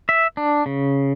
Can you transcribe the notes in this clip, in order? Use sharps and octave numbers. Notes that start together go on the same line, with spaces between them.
E5
D4
C#3